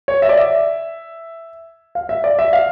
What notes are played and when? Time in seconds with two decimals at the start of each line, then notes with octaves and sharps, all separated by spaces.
0.08 C#5
0.22 E5
0.29 D5
0.38 E5
1.95 F5
2.09 E5
2.24 D5
2.39 E5
2.53 F5